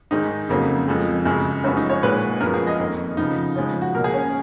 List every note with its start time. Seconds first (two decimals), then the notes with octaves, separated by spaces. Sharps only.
0.11 G#2 D#3 G#3 D#4
0.49 F2 C#3 F#3 A#3
0.88 F2 F3 G#3
1.25 F#2 C#3 G#3
1.64 F#2 F3 G#3 B3 C#4
1.77 D#4
1.90 C#5
2.02 A#2 G#3 B3 B4
2.40 F#2 F3 G#3 B3 A#4
2.54 G#4
2.67 D#5
2.79 F2 D#3 A#3
3.17 C#3 F3 B3 D#4
3.56 C#3 F3 G#3 C#4
3.82 F#4
3.94 B2 A#3 A#4
4.04 G#4
4.14 C#4